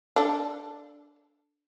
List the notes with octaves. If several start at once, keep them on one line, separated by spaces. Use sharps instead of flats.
D4 A4